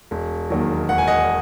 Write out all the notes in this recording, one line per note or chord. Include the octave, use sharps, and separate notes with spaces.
E1
D#2 D#3 F#3
E1 F#5
G#5
D#5 F#5